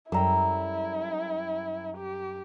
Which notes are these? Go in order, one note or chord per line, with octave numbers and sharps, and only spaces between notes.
F#2 G3 E4 A4 G5 A#5 E6
G4